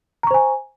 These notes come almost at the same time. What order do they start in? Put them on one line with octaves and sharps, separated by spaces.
A#5 C#6 C5 G#5